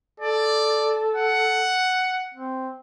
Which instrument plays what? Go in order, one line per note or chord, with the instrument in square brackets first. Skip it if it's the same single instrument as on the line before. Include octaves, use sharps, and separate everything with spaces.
[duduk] A4 [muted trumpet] D5
[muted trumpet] F#5
[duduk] C4